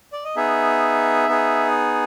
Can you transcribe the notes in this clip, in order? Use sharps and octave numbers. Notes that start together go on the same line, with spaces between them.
D5
D#5
B3 D#4 G#4 E5
B3 D#4 G#4